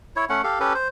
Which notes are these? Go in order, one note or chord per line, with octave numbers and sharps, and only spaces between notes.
E4 C#5
A3 C#4 F#5
G4 A4 F5
C#4 G4 A4 B4
C5